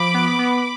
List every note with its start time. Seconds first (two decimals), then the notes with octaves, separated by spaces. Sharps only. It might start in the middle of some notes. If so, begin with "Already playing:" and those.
Already playing: F3 B5 D6
0.14 B3
0.39 B3